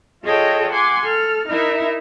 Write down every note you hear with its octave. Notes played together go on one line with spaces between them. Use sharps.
F4 G#4 A4 C#5 D#5 G5
F#5 G#5 C6 D6
A4 F6
D#4 E4 A#4 E5